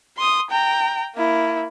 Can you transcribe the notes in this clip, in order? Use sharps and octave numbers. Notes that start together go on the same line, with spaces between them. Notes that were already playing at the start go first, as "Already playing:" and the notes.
C6 D#6
G5 A#5
A#3 E4